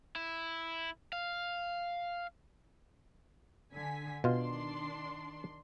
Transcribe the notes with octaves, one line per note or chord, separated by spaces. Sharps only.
E4
F5
D3 G#5 B6
B2 D#3 D4 F4 C6